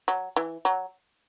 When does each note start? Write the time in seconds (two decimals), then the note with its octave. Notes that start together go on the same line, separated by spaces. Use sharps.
0.08 F#3
0.36 E3
0.65 F#3